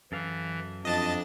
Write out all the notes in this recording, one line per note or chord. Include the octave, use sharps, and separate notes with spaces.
F#2 E3 A4 F5
F2 D4 D#5 A5 A6